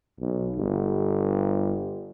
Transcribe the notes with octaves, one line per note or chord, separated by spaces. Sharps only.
B1
G1